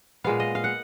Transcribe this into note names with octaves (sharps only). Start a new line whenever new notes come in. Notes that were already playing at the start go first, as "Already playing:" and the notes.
A#2 G#3 B3 F5
D#5
F5
F#5